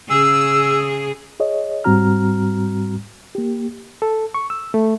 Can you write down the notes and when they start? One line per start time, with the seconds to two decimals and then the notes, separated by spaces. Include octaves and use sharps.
0.10 C#3 G#4 E6
1.40 G#4 C#5 D#5
1.84 G#2 G3 C4 F#4 A#5 F6
3.35 A#3 G4
4.02 A4
4.34 C#6
4.50 E6
4.74 A3